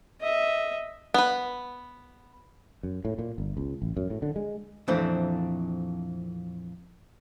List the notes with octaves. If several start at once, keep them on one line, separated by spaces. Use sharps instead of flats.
D#5 E5
B3 B4
F#2
A2
A#2
G1
C#2
A1
F#2
A2
D3
G#3
F2 A#2 E3 A3 C4 D4